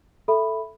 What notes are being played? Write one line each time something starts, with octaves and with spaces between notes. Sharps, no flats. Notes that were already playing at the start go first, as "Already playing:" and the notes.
A4 E5 B5